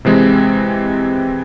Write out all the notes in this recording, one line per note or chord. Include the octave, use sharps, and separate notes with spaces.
C3 E3 G#3 C4